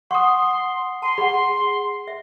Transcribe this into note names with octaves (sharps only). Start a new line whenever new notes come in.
F#5 C6 C#6 D#6
A5 C6
G#4 F#5 B5
E5